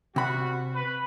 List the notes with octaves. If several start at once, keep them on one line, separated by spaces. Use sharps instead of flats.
C3 G3 F#4 B5
B4